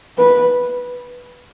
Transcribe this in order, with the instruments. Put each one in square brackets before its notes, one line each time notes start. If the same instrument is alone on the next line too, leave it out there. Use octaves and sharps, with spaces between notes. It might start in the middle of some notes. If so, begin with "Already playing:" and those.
[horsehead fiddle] B4